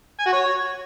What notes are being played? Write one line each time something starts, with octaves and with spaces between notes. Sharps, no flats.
G#5
F#4
C#5